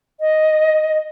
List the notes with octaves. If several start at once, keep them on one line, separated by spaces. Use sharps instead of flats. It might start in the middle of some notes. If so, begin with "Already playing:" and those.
D#5